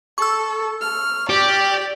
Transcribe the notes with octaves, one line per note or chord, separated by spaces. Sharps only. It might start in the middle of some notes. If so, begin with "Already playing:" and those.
A4 C#6 E6
F6
G4 D5